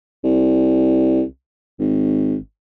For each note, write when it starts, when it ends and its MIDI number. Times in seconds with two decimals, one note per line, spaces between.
0.24 1.22 36
1.79 2.36 32